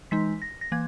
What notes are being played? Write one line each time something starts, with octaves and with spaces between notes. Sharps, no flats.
E3 G#3 D#4 B6
A#6
A#6
E3 A#3 G#6